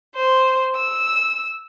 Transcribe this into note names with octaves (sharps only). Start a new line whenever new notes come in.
C5
E6